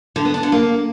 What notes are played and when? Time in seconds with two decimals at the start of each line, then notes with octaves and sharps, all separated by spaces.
0.16 D3
0.25 B3
0.34 D4
0.43 D3
0.52 A#3